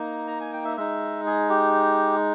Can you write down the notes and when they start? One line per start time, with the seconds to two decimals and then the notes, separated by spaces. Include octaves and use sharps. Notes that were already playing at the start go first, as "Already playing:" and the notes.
Already playing: A#3 D#4
0.28 A#5
0.41 G#5
0.53 G5
0.65 E5
0.77 G#3 D#4 E5
1.26 G#4
1.50 G4